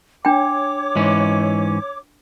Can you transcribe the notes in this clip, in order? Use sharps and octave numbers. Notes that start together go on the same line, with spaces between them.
D4 C#5 G5 D6
G#2 E3 C#4